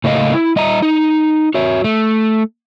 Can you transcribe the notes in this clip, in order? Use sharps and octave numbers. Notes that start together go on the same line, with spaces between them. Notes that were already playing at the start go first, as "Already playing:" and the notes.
A2 C#3 A3 A#3 D#5 F5
E4
G3 D#5 E5 A#5
D#4
F#4 C#5 E5
A3